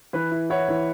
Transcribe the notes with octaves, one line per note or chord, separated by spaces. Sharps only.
E3 B4
E4
E4 C#5 F#5
E3